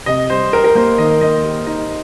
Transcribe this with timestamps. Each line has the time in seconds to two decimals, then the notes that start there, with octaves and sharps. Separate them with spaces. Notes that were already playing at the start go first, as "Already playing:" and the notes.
0.06 C3 D#5
0.30 G3 C5
0.53 G4 A#4
0.64 A#4
0.75 A#3 C5
0.98 D#3 D#5
1.21 A#3 D#5
1.44 G4
1.66 D#4 D#5